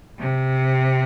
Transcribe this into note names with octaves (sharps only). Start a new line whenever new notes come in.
C3